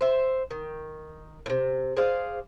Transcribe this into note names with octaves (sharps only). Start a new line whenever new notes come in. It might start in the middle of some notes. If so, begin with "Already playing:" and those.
C5 E5
D#3
A2 C3
G#4 C5 D5 F5